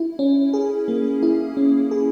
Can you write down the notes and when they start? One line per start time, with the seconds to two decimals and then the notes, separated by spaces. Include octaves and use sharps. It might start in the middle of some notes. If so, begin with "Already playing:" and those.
Already playing: E4
0.19 C#4
0.53 G#4
0.88 A#3
1.23 E4
1.57 C#4
1.91 G#4